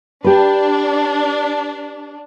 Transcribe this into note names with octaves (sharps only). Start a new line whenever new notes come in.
D4 G4 B4